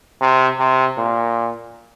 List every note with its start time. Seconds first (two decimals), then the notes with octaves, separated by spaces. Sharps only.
0.21 C3
0.59 C3
0.97 A#2